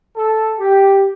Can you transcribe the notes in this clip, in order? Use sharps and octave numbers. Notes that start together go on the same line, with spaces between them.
A4
G4